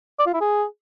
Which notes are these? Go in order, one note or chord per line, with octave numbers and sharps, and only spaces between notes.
D5
F4
E4
G#4